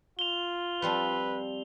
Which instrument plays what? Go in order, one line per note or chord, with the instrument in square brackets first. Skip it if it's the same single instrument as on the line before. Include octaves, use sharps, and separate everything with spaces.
[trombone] F4 [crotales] F7 G7
[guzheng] F3 G3 C4 [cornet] B4